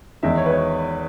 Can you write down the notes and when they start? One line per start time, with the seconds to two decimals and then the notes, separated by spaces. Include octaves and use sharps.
0.23 E2 D#3 G#3 E5
0.38 C#5
0.46 B4
0.52 C#5